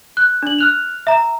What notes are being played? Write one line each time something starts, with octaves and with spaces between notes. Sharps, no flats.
F#6
D4 F#7
F6 F#6 F7
E5 A#5